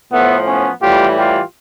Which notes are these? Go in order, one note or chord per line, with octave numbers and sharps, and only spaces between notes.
A2 F3 A3 B3
B3 C#4
A2 E3 G3 F4 G4
F4 G4